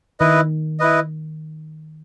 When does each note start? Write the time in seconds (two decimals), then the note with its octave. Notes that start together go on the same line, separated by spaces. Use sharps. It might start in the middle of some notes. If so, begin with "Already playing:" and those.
0.20 D#3 E4 B4 D#5
0.79 E4 B4 D#5